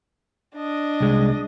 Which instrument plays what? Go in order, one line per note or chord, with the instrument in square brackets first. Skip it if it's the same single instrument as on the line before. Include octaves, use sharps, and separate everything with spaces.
[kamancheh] D4 D#5
[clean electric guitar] C2 G#3